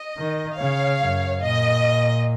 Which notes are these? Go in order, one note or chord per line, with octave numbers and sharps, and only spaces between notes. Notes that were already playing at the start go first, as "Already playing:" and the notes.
Already playing: D#5
D#3
C#3 C#5 F5
F#2
A#2 D#5